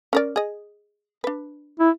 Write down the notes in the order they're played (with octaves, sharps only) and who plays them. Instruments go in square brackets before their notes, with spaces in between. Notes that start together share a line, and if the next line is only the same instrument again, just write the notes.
[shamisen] C#4 A#4 D5
G#4 D#5
D4 B4
[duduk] E4